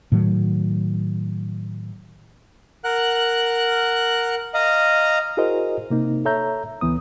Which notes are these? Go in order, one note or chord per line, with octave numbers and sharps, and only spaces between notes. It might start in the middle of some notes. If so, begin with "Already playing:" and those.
A2 D#3 F#3
A#4 F#5 F#6
D#5 F5 A#5
E4 F#4 G#4 A#4 C5 D#5
C3 A#3 D#4
A4 C#5 E5 A#5 G6
C#2 E3 B3 D#6